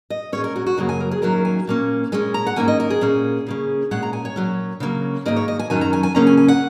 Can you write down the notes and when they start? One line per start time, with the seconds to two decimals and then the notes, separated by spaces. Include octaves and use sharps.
0.10 D#5
0.32 A#2 G#3 C#4 C#5
0.44 A#4
0.56 F#4
0.66 F#4
0.78 F#2 C#3 F#3 A#3 D#5
0.89 G#5
1.00 A#4
1.11 G#4
1.22 F#2 D#3 F#3 A#3 C#4 A#4
1.45 G#5
1.67 A#2 A#3 C#4
2.12 A#2 G#3 C#4 G#5
2.34 A#5
2.47 F#5
2.56 G#2 D#3 A#3 C#4 G#5
2.68 D#5
2.80 A#4
2.90 G#4
3.01 A#2 A#3 C#4
3.47 C#3 A#3 C#4
3.91 A#2 G#3 C#4 F#5
4.03 A#5
4.13 G#5
4.25 C#5
4.36 A#2 F#3 C#4
4.80 C#3 F#3 A#3 C#4
5.26 G#2 D#3 A#3 D#5
5.36 C#5
5.48 D#5
5.59 G#5
5.70 F#2 D#3 F#3 C#4 G#5
5.81 A#5
5.93 G#5
6.03 G#5
6.15 C#3 F#3 A#3 C#4 A#5
6.27 G#5
6.37 G#5
6.48 F#5